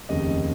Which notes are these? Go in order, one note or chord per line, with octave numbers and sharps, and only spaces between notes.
F1 D#2 C#3 D#5